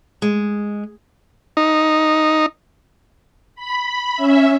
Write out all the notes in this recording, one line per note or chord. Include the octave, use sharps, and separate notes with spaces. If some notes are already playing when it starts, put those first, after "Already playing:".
G#3
D#4
B5
C#4 E5